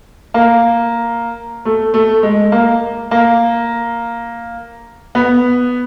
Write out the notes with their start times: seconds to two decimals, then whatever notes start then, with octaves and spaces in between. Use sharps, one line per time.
0.34 A#3
1.65 A3
1.94 A3
2.23 G#3
2.52 A#3
3.11 A#3
5.15 B3